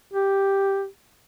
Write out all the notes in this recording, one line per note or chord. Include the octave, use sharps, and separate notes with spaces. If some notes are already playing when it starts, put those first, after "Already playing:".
G4